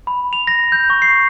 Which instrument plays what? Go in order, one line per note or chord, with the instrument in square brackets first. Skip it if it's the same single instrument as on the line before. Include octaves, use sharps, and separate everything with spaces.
[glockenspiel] B5
F7
A#6
G6
C#6
C7